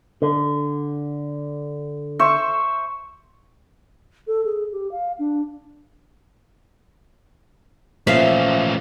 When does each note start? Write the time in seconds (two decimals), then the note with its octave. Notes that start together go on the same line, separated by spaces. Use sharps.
0.22 D3
2.19 C5 E5 C#6
4.27 A4
4.45 G#4
4.72 G4
4.91 F5
5.19 D4
8.07 A#2 F3 A3 C#4 E5 F5